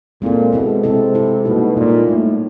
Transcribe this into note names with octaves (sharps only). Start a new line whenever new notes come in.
A#2 G#3 C4 E4 A4
B2 G#3 C4 E4 A4
C3 G#3 C4 E4 A4
G#3 C4 E4 A4
B2 G3 A#3 D#4
A#2 G3 A#3 D#4
A2 G3 A#3 D#4